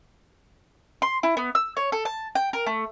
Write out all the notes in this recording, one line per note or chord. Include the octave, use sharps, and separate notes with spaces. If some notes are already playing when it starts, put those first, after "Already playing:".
C6
E4
B3
E6
C#5
A4
A5
G5
A#4
A3